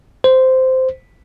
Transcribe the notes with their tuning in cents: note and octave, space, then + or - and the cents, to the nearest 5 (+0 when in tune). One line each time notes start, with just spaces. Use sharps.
C5 -10